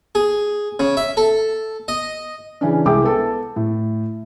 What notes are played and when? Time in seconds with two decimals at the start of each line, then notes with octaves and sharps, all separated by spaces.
0.15 G#4
0.79 C#3
0.97 E5
1.17 A4
1.88 D#5
2.61 C#3 E3 C#4 D4
2.85 C2 G#3 E4 G5 D6
3.04 B3 A4 A5
3.56 A2